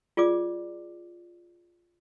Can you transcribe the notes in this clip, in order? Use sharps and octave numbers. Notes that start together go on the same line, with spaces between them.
F4 G#4 D5 D6